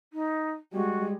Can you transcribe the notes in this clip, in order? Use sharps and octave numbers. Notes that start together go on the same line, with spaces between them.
D#4
G3 G#3 F#4